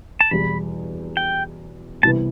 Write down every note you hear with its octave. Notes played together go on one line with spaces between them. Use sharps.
A5
E2 B2 G3 B5
G5
C2 C3 E3 B3 A5